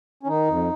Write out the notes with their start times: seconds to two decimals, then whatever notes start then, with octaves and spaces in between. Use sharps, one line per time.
0.23 C#4
0.27 D#3 D#4
0.48 F2